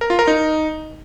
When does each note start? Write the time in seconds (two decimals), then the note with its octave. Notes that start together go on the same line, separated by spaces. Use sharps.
0.01 A#4
0.10 F4
0.19 A#4
0.27 D#4